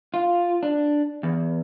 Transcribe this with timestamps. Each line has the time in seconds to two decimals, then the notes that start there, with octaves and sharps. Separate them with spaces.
0.14 F4
0.63 D4
1.23 E2